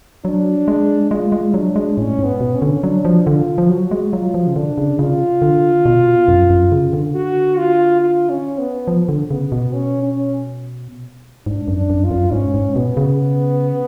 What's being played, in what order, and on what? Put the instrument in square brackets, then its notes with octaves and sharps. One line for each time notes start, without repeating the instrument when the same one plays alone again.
[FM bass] F#3 [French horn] D4
[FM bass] G#3
[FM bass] G#3 [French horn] F4
[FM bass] G#3
[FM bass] F#3 [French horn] D4
[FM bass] G#3
[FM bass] A2 [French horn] C#4
[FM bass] G#2
[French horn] B3
[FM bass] B2
[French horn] C#4
[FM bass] D3
[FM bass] F#3 [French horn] D4
[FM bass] F3
[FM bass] D3 [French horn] F4
[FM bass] F3
[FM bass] F#3 [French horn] F#4
[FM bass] G#3
[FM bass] F#3 [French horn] F4
[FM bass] F3
C#3
[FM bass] D3 [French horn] D4
[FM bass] C#3
[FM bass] C#3 [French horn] F4
[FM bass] D3
B2
F#2
F#2
C#3
D3
[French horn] F#4
F4
F4
C#4
B3
[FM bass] F3
D3
[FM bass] C#3 [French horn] B3
[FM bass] B2
[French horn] C#4
C#4
[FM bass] G#2 [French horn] D4
[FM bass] F#2
[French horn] D4
[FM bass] F#2
[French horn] F4
[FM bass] F#2
[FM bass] G#2 [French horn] C#4
[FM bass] G#2
[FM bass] B2 [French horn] B3
[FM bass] C#3